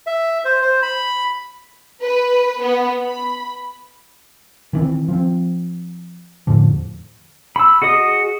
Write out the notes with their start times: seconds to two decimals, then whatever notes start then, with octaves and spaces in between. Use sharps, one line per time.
0.07 E5
0.45 C5
0.62 C5
0.82 B5
2.02 B4
2.60 B3
3.02 B5
4.73 D#3 E3 C4
5.08 F3 C4
6.47 E2 A2 D3 F3
7.56 B5 E6
7.82 F#4 G#4 D#5 D#6